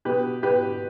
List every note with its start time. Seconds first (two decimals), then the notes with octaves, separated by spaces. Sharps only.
0.05 B2 G4 B4
0.43 B2 G4 B4